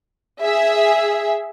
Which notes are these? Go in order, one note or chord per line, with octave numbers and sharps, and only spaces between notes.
G#4 E5